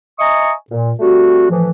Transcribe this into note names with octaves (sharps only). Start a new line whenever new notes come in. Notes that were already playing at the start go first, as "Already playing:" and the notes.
D#5 E5 G#5 A#5 C#6 D#6
A#2
G3 A3 C4 F#4
A2 E3 F3